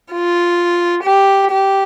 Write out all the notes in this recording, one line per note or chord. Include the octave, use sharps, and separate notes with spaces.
F4
G4
G4